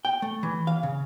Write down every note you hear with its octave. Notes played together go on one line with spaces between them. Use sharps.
G5
A3
E3
F5
C#3